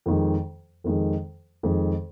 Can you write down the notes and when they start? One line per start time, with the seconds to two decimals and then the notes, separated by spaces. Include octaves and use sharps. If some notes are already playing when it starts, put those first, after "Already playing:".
0.06 F2 D#3 G#3
0.84 F2 D#3 G#3
1.63 F2 D#3 G#3